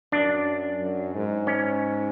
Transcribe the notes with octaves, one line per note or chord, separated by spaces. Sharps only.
F#2 D4
F#2
G#2
C#4